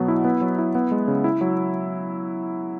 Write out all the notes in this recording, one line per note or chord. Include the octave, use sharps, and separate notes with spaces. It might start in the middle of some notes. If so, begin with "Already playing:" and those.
Already playing: B2 F#3 B3
E4
B3
F#3
E4
B3
G#3
C#3
E4
F#3